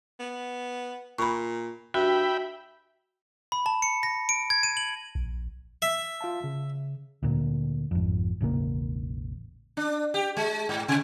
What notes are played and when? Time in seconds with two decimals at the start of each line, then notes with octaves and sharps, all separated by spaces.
0.20 B3
1.18 A#2 B5 C#6
1.94 G2 F#4 E5 G5 B5
3.52 B5
3.66 A5
3.82 C#7
4.03 A#6
4.29 D7
4.50 G#6
4.63 D#7
4.77 F#7
5.15 A#1
5.82 E5
6.21 F4 F5 A5
6.44 C#3
7.23 D2 A#2
7.91 G#1 F2
8.41 E1 A1 C#3 A#3
9.77 D4
10.14 G4
10.37 G#3
10.69 G#2
10.88 C3